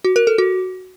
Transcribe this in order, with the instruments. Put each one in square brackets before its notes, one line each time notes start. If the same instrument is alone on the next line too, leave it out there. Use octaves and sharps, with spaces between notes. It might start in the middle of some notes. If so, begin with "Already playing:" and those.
[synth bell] F#4
A#4
A4
F#4